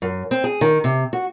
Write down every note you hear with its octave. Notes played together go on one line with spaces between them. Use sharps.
F#2
C4
G#4
D#3
C3
F#4